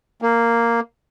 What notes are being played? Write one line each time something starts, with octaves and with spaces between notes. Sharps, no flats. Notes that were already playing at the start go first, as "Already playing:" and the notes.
A#3